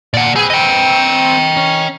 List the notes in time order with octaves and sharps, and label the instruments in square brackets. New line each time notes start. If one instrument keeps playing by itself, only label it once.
[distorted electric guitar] A#2 [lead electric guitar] D5 F#5
[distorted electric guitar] C4 B4 [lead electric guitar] G#4
[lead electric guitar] D#5 G5
[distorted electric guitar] C#4